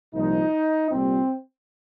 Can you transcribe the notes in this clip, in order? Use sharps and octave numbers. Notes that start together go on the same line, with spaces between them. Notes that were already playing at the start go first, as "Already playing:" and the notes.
C2 A#2 F3 D#4
C2 A#2 G3 C4